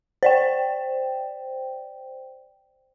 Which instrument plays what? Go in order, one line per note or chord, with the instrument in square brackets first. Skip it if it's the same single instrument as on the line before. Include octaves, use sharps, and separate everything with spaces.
[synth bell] C5 D5 G5